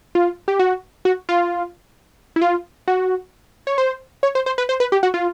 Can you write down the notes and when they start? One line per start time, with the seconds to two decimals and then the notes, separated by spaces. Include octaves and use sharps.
0.15 F4
0.48 G4
0.59 F#4
1.05 F#4
1.29 F4
2.36 E4
2.42 F4
2.88 F#4
3.67 C#5
3.78 C5
4.23 C#5
4.35 C5
4.46 C5
4.58 B4
4.69 C5
4.80 B4
4.92 G4
5.03 F#4
5.14 F4